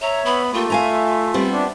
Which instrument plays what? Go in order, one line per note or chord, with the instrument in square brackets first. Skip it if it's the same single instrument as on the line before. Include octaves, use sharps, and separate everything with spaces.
[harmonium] C#5 E5 [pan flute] A#5
[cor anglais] B3 [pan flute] B5
[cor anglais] A3 [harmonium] A#3 G4 [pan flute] F4
[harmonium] E5 [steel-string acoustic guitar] F5 G#5 A#5
[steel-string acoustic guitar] G3 B3 C4
[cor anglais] D4